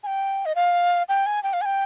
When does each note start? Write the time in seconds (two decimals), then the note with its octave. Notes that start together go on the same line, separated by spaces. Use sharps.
0.03 G#5
0.07 G5
0.46 D#5
0.55 F5
1.09 G5
1.26 G#5
1.43 G5
1.53 F5
1.61 G#5
1.66 G5